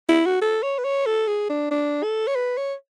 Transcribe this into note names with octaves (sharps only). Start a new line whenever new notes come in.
E4
F#4
A4
C#5
B4
C#5
A4
G#4
D4
D4
A4
C#5
B4
C#5